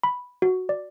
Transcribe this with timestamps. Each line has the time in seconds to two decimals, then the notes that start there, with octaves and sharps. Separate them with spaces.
0.03 B5
0.42 F#4
0.69 D5